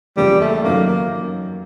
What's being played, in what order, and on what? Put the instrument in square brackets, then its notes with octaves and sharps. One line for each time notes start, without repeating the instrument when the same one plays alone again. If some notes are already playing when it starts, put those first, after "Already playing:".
[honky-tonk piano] E2 C#3 F3 A#3 [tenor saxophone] G3
[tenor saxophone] A3
[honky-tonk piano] F#2 D#3 F#3 [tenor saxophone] A#3
[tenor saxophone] A#3